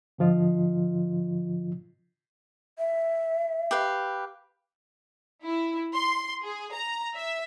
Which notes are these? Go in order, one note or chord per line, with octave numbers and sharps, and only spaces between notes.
G#2 D3 F3 F4 D#5
E5
G4 B4 F5
E4
C6
G#4
A#5
E5